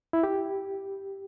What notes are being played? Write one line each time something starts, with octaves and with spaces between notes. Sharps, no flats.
E4
G4